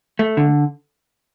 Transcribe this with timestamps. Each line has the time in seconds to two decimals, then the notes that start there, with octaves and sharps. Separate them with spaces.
0.19 A3
0.37 D3